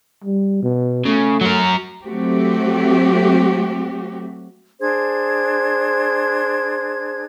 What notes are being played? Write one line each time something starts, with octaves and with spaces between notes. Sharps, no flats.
G3
B2
C#3 A3
F#3 A#4
F#3 A3 C4 F#4 G4
D4 G#4 C5 G#6